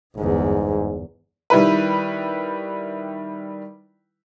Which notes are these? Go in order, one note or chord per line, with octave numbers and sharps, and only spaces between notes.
G1 E2 G#2
D#3 G3 E4 B4